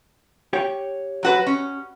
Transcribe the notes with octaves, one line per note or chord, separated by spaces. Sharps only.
G4 C#5 G5
F#3 F#4 B4
C#4